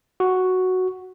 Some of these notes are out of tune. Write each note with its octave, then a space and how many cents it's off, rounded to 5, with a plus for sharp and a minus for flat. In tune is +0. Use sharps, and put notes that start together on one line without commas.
F#4 +0